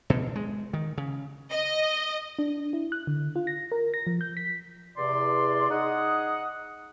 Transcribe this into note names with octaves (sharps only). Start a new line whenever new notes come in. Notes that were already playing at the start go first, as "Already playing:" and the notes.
B2
G#3
D#3
C#3
D#5
D4
E4
F#6
D3
F4
A#6
A#4
A#6
F3
G6
B6
E2 C3 D5 C6
D#4 G#4 F#5 D#6